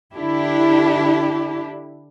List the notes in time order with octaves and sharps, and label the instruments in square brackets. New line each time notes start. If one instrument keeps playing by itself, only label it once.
[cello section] D3 D4 E4 G4